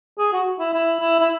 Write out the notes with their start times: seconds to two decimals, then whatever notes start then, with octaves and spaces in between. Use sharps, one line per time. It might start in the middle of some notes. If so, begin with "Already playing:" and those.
0.19 G#4
0.33 F#4
0.59 E4
0.73 E4
1.00 E4
1.20 E4